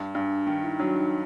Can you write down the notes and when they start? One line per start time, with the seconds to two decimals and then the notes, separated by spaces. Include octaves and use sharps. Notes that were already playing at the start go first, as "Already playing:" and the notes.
Already playing: G2
0.15 G2 D4
0.47 D#3 D#4
0.64 E4
0.79 F#3 D4
0.97 D#4